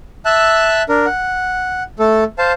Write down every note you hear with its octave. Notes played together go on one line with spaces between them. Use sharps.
E5 A5 E6 F#6
D4 A#4
F#5
A3 A4
C5 F5 A5